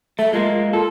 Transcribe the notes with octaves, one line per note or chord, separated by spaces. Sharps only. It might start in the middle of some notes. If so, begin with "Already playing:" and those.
A3 E5
G#3 A#3 F4
F4 A4